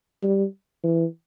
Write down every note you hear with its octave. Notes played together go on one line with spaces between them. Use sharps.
G3
E3